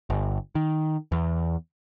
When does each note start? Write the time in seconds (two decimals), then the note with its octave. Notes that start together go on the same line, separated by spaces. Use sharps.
0.10 G1
0.55 D#3
1.12 E2